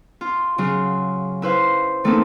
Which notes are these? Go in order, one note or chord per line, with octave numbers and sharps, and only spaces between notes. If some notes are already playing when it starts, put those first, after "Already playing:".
F4
C#3 F#3 F4
E4 B4 C5 F5
E3 A3 A#3 C4 D#4 A4